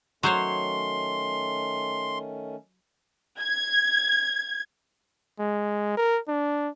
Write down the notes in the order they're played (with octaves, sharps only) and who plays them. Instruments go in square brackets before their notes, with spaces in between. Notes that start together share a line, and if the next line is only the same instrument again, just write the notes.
[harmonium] D#3 A3 C#4 [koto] F#3 C5 C#5 [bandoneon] C6
[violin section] G#6
[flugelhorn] G#3
A#4
D4